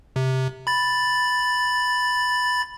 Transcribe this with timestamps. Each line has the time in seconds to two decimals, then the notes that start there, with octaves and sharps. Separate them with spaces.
0.16 C3
0.67 B5 A6